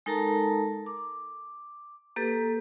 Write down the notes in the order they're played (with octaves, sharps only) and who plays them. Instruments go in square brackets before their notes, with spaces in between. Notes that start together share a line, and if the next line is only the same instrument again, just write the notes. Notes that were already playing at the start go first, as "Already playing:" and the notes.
[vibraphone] G#3 D#4 A4 A#4 A5 A#5
D6
A#3 G4 A4 B4